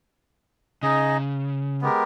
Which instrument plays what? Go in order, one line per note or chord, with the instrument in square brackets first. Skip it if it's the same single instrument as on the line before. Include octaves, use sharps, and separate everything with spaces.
[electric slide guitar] C#3 [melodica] D#4 G#4 D#5
[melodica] G#3 B3 G4 A#4